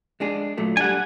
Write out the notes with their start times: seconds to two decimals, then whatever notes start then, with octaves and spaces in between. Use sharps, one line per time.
0.20 G#3 D4 G#4
0.58 A#2 F#3 A3
0.77 G3 D4 F#5 G#5